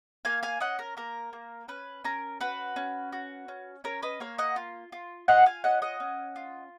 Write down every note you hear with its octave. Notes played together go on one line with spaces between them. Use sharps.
A#3 F5 G#5
F5 G#5
C#4 D#5 F#5
A#4
A#3 A#4
A#3
C#4 B4
C#4 A#4
F#4 B4
C#4
F#4
C#4
C#4 A#4 C#5
B4 D#5
A#3 C#5 F5
D#5 F#5
F4
F4
F4 D#5 F#5
F5 G#5
C#4 D#5 F#5
D#5 F#5
C#4
F4